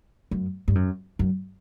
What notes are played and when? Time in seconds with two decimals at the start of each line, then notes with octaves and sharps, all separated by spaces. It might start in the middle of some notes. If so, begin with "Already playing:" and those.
0.31 F#2
0.68 G2
0.75 F#2
1.19 F#2